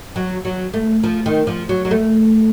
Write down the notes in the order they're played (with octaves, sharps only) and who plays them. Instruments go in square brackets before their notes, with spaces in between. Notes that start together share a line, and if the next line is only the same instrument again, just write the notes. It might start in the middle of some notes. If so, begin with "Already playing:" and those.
[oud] F#3
F#3
A3
F3
D#3
F3
F#3
F#3
A3